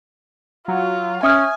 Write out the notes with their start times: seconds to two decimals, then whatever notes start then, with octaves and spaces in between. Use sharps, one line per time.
0.68 F#3 F4
1.23 C#4 E5 G#5 D#6 F6